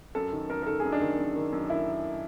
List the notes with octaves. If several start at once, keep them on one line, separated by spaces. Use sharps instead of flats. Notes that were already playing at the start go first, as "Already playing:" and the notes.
F#2 A4
D#3
F#2 A#4
A#4
D#3 A4
F#2 G#4
D4
D#3
F#2
D#3
F#2
D#3 E4